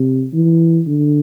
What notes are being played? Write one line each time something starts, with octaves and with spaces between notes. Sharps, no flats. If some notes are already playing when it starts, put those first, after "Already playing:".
Already playing: C3
E3
D3